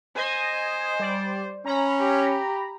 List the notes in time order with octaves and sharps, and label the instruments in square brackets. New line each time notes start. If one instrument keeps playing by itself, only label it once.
[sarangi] C5 [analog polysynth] D#5 G#5
[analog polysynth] G3 D5
[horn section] C#4 [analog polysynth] A#5 B5
[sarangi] G4